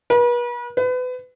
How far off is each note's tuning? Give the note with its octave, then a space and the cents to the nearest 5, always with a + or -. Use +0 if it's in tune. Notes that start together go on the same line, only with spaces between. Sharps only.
B4 -40
B4 +30